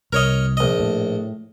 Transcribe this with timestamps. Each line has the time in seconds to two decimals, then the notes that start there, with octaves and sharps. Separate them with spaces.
0.13 C2 A#4 C#5 D#5
0.57 A#1 D#5
0.80 A2